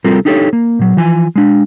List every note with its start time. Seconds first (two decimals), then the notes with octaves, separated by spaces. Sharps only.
0.05 C2 G3 C4 F4 A4 A#4
0.25 D4 D#4 G4 A4 C5 C#5
0.53 A#3
0.79 A#2 F#3
0.97 E3 F3 G#5
1.36 G#3 D4